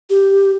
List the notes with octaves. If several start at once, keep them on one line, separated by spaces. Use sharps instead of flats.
G4